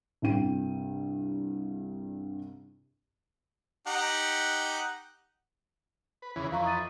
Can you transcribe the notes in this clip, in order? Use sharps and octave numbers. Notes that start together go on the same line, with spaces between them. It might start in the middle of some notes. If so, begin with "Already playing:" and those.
C2 G2 G5 D#7
D#4 G4 F#5
B4
E2 C#3 E3
F2 E3 F5 A#5 C#6
D#6 A6 D#7